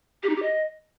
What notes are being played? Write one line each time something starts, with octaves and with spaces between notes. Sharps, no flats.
G4
D#4
G4
D#5